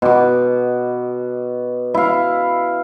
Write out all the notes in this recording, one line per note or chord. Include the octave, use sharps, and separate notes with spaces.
B2 D6
E4 F5